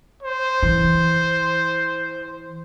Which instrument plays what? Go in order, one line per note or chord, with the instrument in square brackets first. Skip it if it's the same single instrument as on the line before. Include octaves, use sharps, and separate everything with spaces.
[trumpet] C5
[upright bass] E3